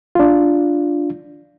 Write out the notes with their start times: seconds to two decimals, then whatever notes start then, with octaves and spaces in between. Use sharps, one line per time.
0.15 D4 F4